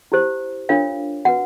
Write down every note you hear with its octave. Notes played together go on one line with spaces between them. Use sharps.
E4 G4 C5
D4 F4 A#4 C#5 F5
F#4 B4 F#5